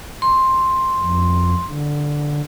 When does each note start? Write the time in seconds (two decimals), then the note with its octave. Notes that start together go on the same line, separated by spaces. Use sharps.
0.22 C6
1.00 F2
1.68 D3